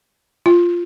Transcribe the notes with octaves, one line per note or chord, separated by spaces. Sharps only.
F4